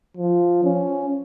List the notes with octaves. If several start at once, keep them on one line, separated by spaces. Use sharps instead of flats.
F3
C#4